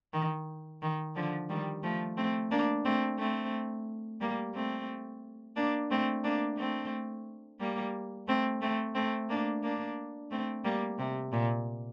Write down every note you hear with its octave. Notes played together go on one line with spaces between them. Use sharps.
D#3
D#3
D3 F3
D#3 G3
F3 A3
A3 C4
A#3 D4
A3 C4
A3 C4
G3 A#3
A3 C4
A#3 D4
A3 C4
A#3 D4
A3 C4
G3 A#3
A3 C4
A3 C4
A3 C4
A#3 D4
A#3 D4
A3 C4
G3 A#3
C3
A#2